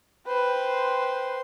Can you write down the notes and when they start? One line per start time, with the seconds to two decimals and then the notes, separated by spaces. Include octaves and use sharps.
0.28 B4 C5 G5 C6